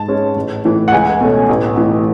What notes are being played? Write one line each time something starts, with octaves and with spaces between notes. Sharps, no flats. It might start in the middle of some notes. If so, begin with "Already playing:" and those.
Already playing: G#2 A5
G#3 C#4
A1
A2 E3
F#5
C#2 G#5
B2 A3 C#4
A1
A2 E3